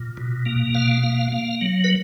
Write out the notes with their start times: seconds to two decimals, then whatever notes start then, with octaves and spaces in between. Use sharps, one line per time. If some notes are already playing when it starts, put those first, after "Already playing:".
Already playing: A#2
0.17 B2
0.46 A#3
0.75 B2 F5
1.03 A#3
1.32 A#3
1.61 F#3
1.84 B4